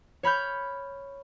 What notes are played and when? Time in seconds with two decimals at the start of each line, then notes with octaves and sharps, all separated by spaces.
0.23 C#5 B5 F6 G6